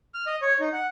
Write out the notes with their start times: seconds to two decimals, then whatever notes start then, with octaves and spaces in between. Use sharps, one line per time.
0.14 F6
0.27 D#5
0.42 C#5
0.60 D#4
0.73 F#5